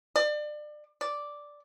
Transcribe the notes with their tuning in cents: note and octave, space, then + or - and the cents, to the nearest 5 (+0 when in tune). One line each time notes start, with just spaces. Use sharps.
D5 +30
D5 -5